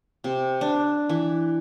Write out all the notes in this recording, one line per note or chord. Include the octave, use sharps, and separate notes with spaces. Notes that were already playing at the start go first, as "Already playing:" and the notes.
C3
D4
E3